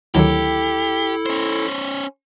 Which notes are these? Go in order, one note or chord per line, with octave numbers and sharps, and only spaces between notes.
D2 D#3 F#3 E4 G4 A4
C#4 C5